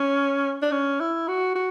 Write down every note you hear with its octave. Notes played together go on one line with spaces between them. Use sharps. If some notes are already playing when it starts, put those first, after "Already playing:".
Already playing: C#4
D4
C#4
E4
F#4
F#4